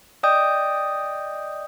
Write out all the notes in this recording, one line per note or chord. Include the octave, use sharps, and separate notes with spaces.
D5 D#5 G5 D#6 G6